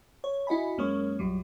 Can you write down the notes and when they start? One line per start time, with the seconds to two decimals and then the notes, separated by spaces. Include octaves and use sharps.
0.24 C#5
0.47 E4 F#4 D#5 G#5 B5
0.78 F#2 G#3 A#3 C#4 C#5 C#6
1.19 A#1 F#2 F#3 G3